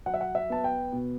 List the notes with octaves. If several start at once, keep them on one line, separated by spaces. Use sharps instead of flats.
F#3 F#5
E5
F#5
E5
B3 A5
G5
B2